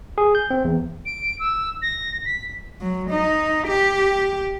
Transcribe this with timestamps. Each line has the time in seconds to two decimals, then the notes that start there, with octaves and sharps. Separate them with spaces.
0.18 G#4
0.35 G6
0.50 C4
0.65 E2
1.06 D7
1.39 E6
1.82 A#6
2.25 B6
2.81 F#3
3.10 D#4
3.67 G4